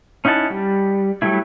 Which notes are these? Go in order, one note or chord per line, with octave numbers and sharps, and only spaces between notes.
C#4 D#4 E4 F#5 A5
G3
F#3 G3 A3 E4